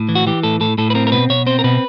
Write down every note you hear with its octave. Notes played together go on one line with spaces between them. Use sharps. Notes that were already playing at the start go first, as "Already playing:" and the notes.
Already playing: A2
E3
F#4
E3 G4
A2 A4
A2 A4
A2 A4
B4
C4 A#4
A#4
B2 B4
B2 C#5
C4 C5
A#4
B2 B4